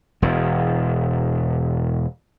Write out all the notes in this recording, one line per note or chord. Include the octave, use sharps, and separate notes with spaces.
E1 E2